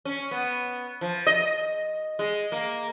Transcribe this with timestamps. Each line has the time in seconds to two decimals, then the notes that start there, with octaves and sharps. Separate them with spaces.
0.05 C#4
0.31 B3
1.01 F3
1.27 D#5
2.19 G#3
2.52 A#3